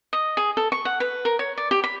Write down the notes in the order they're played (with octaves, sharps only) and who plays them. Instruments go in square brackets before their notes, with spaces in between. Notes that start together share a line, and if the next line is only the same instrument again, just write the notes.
[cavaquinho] D#5
G#4
A4
C#6
F#5
B4
A#4
C#5
D5
G4
B5